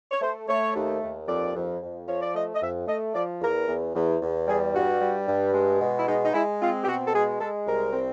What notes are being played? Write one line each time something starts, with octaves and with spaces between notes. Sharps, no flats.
C#5
A3 C5
A3 C#5
D#2
D#2
F2 D5
F2
F2
F3 C#5
D5
A3 D#5
D#5
F2 E5
A3 D#5
F3 D5
E2 A#4
E2
E2
E2
G3 G#4
G2 F#4
G3
G2
G#3
B2
E4
G#3 D#4
D#4
G#3 E4
C4 F4
G4
B2 F#4
A4
G#3 G#4
G#3 A4
C2 A#4
C4